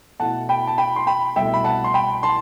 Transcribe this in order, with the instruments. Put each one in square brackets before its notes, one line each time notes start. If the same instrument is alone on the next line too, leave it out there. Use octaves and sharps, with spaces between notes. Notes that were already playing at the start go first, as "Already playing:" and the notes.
[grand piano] B2 A3 E4 F#5 A5
G5 B5
A5
G5 B5
C6
G5 B5
C2 B2 A3 E5 G5
B5
F#5 A5
C6
G5 B5
A5 C6